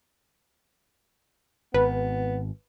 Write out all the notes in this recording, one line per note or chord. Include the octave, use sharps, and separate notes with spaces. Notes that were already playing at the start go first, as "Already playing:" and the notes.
G#1 B3 B4